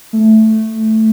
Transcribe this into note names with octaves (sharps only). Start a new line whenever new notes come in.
A3